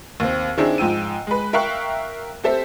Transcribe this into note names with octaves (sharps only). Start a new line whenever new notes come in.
D#2 C4
D#3 C4 D4 E4 G#4
G#2 F3 G5 E6 D#7
G#3 B4
A#4 E5 F5 G5 C#6 F#6
C4 G4 A4 C5 E5